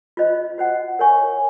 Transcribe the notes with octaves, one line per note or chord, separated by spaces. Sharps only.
F4 C5 D#5
F#4 C5 F#5
A#4 C#5 G#5 C#6